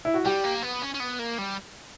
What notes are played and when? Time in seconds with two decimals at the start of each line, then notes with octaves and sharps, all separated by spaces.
0.05 E4
0.14 F#4
0.25 G3 G4
0.44 A#3
0.62 B3
0.82 C#4
0.94 C#4
1.00 B3
1.19 A#3
1.39 G3